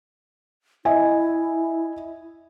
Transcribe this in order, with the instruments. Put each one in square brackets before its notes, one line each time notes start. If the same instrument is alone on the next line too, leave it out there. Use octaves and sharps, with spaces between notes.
[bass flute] E4 [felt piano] D#5 E5 G#5